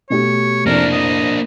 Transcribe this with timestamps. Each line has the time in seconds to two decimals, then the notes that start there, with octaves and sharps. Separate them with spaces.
0.10 B2 A3 G4 C#5
0.66 F1 A#3 D4 E4 A#4 D5
0.92 D#5